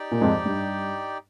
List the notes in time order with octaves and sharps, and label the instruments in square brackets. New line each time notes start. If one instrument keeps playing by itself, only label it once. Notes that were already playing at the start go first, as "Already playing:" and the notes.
Already playing: [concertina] D#4 G4 D5 G5
[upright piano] A#2
F2 G#2
G2